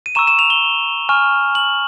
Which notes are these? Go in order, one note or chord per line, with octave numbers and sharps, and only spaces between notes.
D#7
A#5 C#6 E6 E7
E7
F7
G7
G#5 C#6 F6
F#7